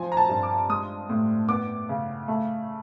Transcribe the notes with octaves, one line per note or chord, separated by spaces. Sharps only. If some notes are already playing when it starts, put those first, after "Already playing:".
Already playing: F3 C4 G#5
A#5
A5
G2
D6
G#3 D#6
A2
B3 D6
C#3
A3